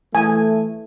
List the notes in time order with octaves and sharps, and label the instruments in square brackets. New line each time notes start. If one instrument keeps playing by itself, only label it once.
[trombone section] E3 A3 [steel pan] G#5